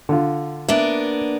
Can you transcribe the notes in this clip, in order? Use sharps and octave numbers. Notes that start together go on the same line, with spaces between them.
D3 F4
A#3 B3 D4 E5